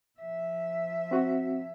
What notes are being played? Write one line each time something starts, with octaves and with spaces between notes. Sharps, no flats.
F3 E5
C4 F#4